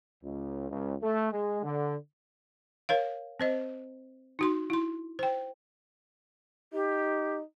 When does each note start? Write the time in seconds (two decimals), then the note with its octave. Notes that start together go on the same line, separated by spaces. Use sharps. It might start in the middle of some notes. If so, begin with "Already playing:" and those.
0.24 C#2
0.70 C#2
1.01 A3
1.32 G#3
1.62 D3
2.89 A#4 C#5 F5
3.40 C4 C5 D#5
4.39 D#4 F#4 C6
4.70 E4 C6
5.19 C5 G5
6.73 D#4 G4